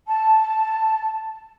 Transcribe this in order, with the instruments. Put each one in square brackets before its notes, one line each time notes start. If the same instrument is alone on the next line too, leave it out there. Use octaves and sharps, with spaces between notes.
[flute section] A5